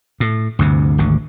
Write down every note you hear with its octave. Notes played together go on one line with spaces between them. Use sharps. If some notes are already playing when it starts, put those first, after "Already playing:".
A2
D2 G2 C3
G#1 D2 D3